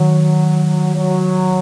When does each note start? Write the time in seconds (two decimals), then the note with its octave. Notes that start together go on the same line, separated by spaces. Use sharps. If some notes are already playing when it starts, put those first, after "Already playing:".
Already playing: D#3 F#3
0.95 F#3